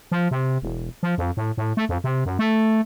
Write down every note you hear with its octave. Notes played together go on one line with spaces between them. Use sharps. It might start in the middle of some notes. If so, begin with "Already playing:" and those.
F3
C3
E1
F3
F2
A2
A2
A3
F2
C3
F#2
A3